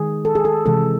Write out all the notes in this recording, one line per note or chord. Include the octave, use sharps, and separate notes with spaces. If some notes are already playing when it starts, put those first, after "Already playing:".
Already playing: D#3 G#3 G#4
A4
G#4
A4
C3 E3 G#3 A4